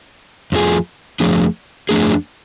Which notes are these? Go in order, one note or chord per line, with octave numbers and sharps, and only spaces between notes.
F2 F3 A3 D4 G#4
F2 F3 A3 D4 G#4
F2 F3 A3 D4 G#4